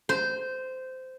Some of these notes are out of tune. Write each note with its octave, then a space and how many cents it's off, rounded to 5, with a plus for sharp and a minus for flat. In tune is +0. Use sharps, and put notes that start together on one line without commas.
C5 -15